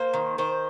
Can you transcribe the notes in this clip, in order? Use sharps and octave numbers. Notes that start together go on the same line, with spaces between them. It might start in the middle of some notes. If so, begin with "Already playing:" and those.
Already playing: A#3 C5
D#3
D#3 C5